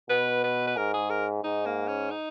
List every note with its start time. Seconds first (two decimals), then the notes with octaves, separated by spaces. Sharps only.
0.09 B2 B4
0.44 B4
0.67 B4
0.77 G#2 A#4
0.94 G#4
1.10 A#4
1.44 G#2 D#4
1.66 A#3
1.88 C#4
2.10 D#4